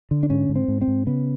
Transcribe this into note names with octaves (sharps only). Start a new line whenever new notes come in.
D3
D4
G#2 C#4
G#2
C4
G#2
C4
G#2
C#3 B3